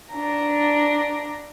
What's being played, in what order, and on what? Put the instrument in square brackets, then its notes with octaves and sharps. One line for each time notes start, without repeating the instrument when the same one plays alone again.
[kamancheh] D4 A#5